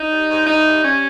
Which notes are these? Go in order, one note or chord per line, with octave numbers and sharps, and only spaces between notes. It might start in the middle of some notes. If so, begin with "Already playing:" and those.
Already playing: D#4
G3
G#2
E3 D#4
G3
G3 C#4